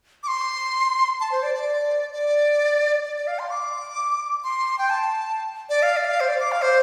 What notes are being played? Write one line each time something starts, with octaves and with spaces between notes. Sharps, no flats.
D6
C6
A5
C5
D5
D5
D5
D5
D5
F5
C6
D6
C6
G5
A5
D5
F5
D5
F5
C5
D5
D6
F5
C5